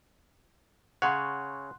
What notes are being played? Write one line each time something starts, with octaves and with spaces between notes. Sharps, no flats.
C#3 C#5 F#5 C6 F#6